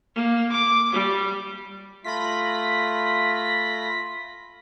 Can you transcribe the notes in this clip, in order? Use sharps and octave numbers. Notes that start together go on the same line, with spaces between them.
A#3
D6
G3
A3 F4 B5 A#6 B6